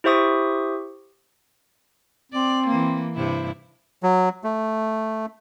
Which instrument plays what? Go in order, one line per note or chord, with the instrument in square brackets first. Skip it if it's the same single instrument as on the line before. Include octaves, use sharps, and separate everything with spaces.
[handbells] E4 G4 C5 E5 C#6 D#6
[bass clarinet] C4 [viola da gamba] D5
[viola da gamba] E3 A#3
G2 C3 E4
[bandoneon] F#3
A3